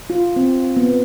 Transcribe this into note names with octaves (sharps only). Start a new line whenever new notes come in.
F4
C4
B3